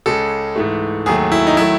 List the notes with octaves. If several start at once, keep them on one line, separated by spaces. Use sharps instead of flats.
C#2 C#3 G#3 A4
G#2 E3 A3
D#2 D#3 F#3 A3 G#4
E4
D#4
D#3 F#3 A3 E4